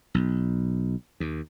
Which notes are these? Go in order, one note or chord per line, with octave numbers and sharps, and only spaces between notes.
B1
D#2